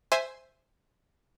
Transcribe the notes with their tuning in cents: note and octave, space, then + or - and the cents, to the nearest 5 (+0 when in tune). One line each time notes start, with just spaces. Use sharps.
C5 +0 E5 +5 G#5 +0